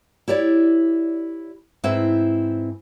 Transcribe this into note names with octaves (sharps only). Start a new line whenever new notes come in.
E4 G4 C#5 D5
G#2 C4 E4 B4 C5 E5